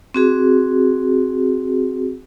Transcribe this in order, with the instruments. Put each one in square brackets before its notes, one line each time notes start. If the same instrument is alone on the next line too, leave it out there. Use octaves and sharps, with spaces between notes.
[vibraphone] C4 F#4 G#4